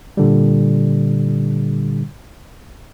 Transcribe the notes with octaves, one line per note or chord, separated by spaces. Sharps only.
A#2 D3 G3